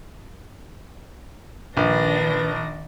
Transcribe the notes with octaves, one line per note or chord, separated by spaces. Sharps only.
A#1 D#3 D4 B4 A#6